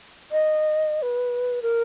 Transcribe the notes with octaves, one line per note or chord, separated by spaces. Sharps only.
D#5
B4
A#4